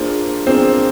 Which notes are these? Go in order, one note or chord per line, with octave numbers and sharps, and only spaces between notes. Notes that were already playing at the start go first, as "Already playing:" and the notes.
Already playing: A#3 D4 F4 G#4 C5
A#3 C4 D4 F4 G#4 C5